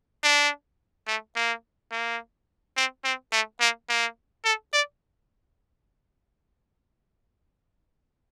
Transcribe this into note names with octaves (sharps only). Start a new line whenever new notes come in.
D4
A3
A#3
A#3
C4
C4
A3
A#3
A#3
A4
D5